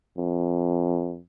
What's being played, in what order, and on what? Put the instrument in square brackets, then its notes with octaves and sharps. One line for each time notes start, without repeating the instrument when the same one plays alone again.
[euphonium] F2